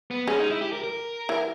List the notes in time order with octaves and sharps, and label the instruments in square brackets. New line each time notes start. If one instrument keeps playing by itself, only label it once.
[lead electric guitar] B3
[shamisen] G#3 [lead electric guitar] C#4
[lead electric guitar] D#4
E4
G4
A#4
A#4
[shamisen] E3